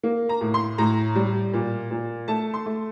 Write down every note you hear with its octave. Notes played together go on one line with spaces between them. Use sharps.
A#3
A#5
A2
C6
A2 A#5
G3
A#2
A#2
A3 A5
C6
A3